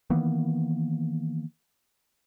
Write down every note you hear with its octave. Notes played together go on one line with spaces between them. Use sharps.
D#3 E3 A#3 B3